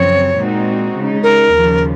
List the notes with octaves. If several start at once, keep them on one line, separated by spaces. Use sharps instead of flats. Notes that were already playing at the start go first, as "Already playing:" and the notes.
Already playing: F#2 C#3 F3 C4 C#5
A#2 G#3 C4 D#4 F#4
C#3 G#3 D#4
A#4
D#2 C#3 F3